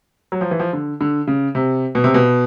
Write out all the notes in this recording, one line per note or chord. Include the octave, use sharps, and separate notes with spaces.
F#3
F3
E3
F3
D3
D3
C#3
C3
B2
C3
B2